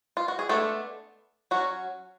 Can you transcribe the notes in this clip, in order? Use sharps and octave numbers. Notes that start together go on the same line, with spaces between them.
F4
F#4
G#4
G#3 A3 B3 D4 A4
F#3 C#4 F#4